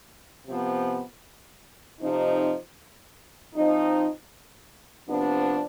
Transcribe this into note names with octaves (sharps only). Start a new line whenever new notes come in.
C3 F3 B3
C3 F3 C4 D#4
F3 C4 D#4
C3 F3 B3 D4